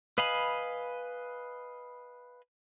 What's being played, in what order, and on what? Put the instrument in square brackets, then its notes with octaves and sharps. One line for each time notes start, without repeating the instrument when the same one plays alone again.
[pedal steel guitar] B4 D#5 F5 G#5 B5